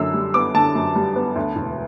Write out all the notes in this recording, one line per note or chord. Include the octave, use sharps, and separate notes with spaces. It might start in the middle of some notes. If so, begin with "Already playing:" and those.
Already playing: F#2 D3 E6
G3
B3 D6
D3 A5
F#2
G3
B3
D2
E1